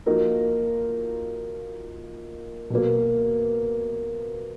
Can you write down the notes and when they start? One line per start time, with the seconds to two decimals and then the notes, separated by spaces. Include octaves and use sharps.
0.06 F3 A#3 D#4 F#4 A#4
2.70 B2 F#3 A#3